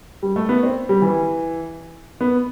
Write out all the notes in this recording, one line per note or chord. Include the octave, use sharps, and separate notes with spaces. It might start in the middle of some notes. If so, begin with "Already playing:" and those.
G3
A3
B3
C4
G3
E3
B3